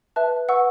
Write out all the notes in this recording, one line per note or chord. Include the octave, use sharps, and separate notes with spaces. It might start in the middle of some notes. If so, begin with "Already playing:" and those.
B4 E5 A5 F#6
B4 F#5 C#6 E6